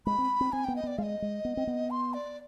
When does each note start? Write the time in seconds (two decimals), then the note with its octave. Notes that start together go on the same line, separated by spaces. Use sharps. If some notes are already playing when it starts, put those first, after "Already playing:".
0.06 G#3 B5
0.18 C4
0.41 C4
0.52 C4 G#5
0.64 B3 G5
0.76 D#5
0.83 B3 D5
0.98 G#3 F5
1.03 D#5
1.22 G#3
1.45 B3
1.57 C4
1.67 B3
1.90 C6
2.14 D5